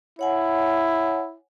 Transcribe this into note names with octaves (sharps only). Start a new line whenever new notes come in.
E4 C#5 F#5 G#5